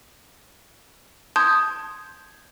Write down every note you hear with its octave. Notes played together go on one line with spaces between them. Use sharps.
A5 C6 D#6 G6 G#6